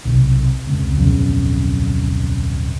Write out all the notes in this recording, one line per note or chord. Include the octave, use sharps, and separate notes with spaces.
B1 C3
F1 C#2 C4
D1 B1 F2 C#3